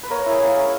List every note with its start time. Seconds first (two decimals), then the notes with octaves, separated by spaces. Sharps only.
0.03 B4
0.10 A#3 A#4 C#5
0.26 E4 G#4
0.42 A#3
0.57 C#4